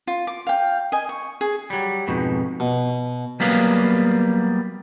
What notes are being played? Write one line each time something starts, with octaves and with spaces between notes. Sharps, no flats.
F4
D6
F5 G5
D#5 G#5
C#6
G#4
F#3 G3
F2 G#2 B2
B2
F#3 G3 A#3 B3 B4 F5